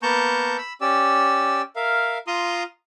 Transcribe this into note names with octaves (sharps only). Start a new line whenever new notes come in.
A#3 B3 A5 A#5 C#6 G6
B5 E6
C#4 G4 D5 E6
A#4 E5 F5
F4 A#5 C6 D#6